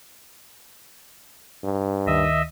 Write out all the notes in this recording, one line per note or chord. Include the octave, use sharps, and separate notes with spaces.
G2
D2 D#3 D#5 E5